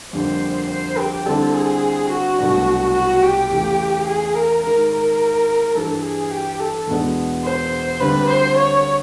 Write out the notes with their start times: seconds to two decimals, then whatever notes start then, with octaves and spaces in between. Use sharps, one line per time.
0.13 F2 D3 G3 A#3 C5
0.70 C5
0.98 G4
1.26 D3 G3 C4 E4 A4
1.54 G#4
2.10 F#4
2.38 C2 B2 F#3 A3 D4
2.94 F#4
3.22 G4
3.51 E2 C#3 E3 A3
4.07 G#4
4.35 A#4
4.63 G#2 D#3 G#3 A#4
4.91 A#4
5.75 G2 E3 G3 A4
6.03 G#4
6.31 G4
6.60 A4
6.88 E2 B2 G#3 B3 D4
7.44 C5
8.00 D2 D3 G3 C4 B4
8.28 C5
8.57 C#5